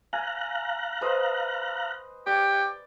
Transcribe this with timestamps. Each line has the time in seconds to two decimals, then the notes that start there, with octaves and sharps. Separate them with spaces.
0.13 F5 G#5 A#5 F#6
1.01 B4 C5 D#5
2.27 G4 D5